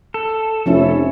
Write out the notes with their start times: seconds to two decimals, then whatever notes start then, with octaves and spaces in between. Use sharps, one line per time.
0.14 A4
0.66 F1 F3 C#4 E4